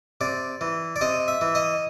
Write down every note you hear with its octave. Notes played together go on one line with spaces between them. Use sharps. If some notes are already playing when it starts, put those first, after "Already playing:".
C3 D5
E3
D5
C3 D#5
E5
E3
D#5